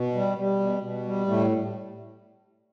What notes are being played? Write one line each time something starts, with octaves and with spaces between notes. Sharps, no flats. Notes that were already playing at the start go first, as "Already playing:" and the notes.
Already playing: B2
G3
G3
B2
B2
G3
A2 A3